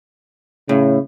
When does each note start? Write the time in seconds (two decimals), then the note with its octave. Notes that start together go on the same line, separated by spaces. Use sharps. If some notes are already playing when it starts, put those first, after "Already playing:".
0.69 A2 C#3